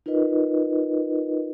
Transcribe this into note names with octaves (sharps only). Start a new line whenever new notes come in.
D#4 F4 A#4 B4 D#5